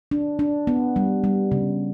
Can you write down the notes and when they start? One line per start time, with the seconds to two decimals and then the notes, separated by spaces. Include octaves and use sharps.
0.11 D4
0.39 D4
0.67 B3
0.96 G3
1.24 G3
1.52 C#3